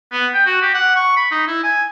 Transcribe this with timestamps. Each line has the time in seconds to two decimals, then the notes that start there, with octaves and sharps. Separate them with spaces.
0.12 B3
0.34 G5
0.46 F#4
0.62 G4
0.74 F#5
0.96 C#6
1.17 B5
1.31 D#4
1.47 E4
1.63 G#5